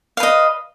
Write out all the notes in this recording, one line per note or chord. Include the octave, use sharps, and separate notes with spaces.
B4 D#5 F5